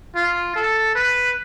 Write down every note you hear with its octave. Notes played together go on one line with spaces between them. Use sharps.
F4
A4
B4